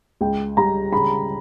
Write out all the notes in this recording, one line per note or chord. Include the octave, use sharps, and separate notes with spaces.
C#2 G5
G3 A#5
C#3 B5